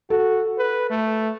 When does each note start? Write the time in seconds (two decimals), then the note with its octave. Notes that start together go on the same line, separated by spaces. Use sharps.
0.10 F#4 A4
0.58 B4
0.90 A3